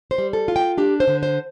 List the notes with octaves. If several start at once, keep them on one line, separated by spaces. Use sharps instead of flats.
C5
G3
A4
F4
G5
D4 G4
C5
D3
C5